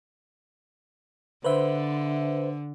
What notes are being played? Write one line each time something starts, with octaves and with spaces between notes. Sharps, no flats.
D3 B4 C5 E5